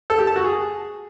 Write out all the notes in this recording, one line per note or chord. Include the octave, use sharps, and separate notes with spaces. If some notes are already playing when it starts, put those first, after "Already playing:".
A4
G4
A5
F#4
G#4